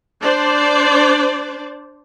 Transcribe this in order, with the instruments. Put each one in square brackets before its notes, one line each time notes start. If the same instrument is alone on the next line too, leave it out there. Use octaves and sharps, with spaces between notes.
[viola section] D4 C5 D5